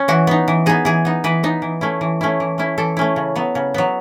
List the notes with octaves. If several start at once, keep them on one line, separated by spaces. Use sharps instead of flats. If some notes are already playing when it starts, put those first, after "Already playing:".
Already playing: C#4
E3 F#4
B3 D#4
E3
B3 D#4 G#4
E3 G#4
B3 D#4
E3 B4
B3 D#4
E3
A3 C#4 E4
E3
A3 C#4 E4
E3
A3 C#4 E4
E3 A4
A3 C#4 E4
C#3
F#3 B3
C#3
F#3 B3